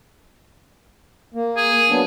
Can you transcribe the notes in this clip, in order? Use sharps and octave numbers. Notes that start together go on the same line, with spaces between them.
A#3
G#4
F#3 B3 D4